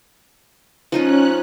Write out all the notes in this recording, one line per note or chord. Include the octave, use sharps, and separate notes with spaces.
F3 C#4 D#4 F4 F#6